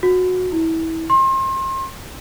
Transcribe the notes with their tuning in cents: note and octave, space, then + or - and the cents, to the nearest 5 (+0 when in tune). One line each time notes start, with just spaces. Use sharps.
F#4 -15
E4 -25
C6 +35